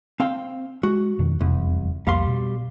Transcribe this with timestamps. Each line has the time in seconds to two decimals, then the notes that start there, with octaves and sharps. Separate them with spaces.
0.20 C4 F5 G5
0.83 G#3 F#4
1.19 F2 B2 D#3
1.41 E1 C2 F2 C3
2.07 C2 F2 G3 A#3 F5 C6
2.27 B2